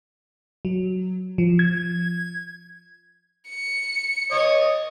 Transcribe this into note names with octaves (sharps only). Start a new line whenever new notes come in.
F#3
F3
G#6
C#7
C#5 D#5 D#6